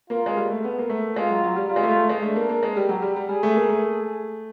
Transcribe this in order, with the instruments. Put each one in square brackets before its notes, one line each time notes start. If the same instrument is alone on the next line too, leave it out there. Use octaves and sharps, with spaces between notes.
[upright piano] A#3 [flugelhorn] F4
[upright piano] G#3
G3
A3
B3
A#3
A3
[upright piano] G#3 [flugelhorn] F4
[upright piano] F#3
F#3
G3
[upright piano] G3 [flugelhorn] F4
[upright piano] G#3
A3
A3
G#3
[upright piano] A3 [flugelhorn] D4
[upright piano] A#3
A#3
G#3
[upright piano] G3 [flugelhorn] G4
[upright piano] F#3
G3
G3
[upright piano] G3 [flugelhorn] G#4
[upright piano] A3
A#3
A3